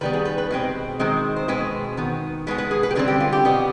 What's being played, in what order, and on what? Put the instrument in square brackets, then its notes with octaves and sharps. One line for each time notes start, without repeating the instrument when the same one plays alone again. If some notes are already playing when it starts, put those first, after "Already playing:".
[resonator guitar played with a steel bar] D#3 G3 B3 B4
G#4
B4
B4
B2 G#3 C4
D#3 G#3 C4
C5
B2 G#3 C4 B4
D#3 B3
B2 G#3 B3 B4
B4
G#4
B4
G4
D3 G3 C4 G#4
G4
F4
G4
B2 B3